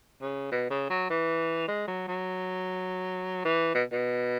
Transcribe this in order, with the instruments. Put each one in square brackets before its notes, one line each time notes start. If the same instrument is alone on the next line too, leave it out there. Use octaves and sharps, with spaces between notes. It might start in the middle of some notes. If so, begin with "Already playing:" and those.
[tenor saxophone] C#3
B2
C#3
F#3
E3
G#3
F#3
F#3
E3
B2
B2